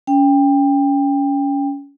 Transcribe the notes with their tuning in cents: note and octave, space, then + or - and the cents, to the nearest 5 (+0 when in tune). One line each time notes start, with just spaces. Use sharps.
C#4 +25 G5 +20